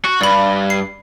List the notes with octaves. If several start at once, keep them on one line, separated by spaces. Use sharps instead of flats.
F#4
G2 D5 B5
C7